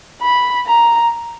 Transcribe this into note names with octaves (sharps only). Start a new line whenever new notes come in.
B5
A#5